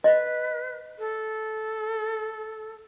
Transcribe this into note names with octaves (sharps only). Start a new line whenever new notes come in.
B4 D#5
A4